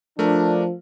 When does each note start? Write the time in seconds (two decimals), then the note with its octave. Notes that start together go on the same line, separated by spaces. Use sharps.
0.19 F3 A3 D4 A#4